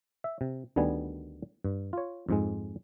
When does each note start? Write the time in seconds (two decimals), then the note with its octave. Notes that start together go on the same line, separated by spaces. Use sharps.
0.24 E5
0.41 C3
0.76 D2 D3 D#3 G3 B3 G#5
1.64 G2
1.93 F4 C#5
2.29 F2 G#2 G#3